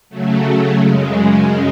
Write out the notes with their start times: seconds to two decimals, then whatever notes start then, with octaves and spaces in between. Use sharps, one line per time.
0.09 C#3 F#3 A3
0.78 F#2 C#3 G#3